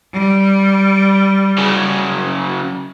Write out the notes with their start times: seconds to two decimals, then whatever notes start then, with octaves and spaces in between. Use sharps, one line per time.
0.13 G3
1.58 F#2 C#3